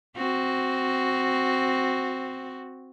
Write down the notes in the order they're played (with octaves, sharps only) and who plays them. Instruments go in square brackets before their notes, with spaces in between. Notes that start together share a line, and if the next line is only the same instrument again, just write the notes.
[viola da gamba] C4 F#4